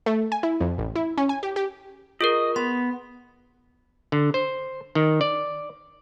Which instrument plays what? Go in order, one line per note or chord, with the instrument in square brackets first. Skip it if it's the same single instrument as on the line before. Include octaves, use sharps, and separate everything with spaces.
[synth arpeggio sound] A3
G#5
E4
F2
A1
E4
C#4
G#5
G4
G4
[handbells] F4 G#4 A#4 [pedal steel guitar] D#5
[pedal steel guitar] B3 [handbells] C6
[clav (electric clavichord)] D3
C5
D#3
D5